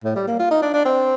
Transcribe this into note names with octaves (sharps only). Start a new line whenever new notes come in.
A2
G3
A#3
F4
D#4
D4
D4
C4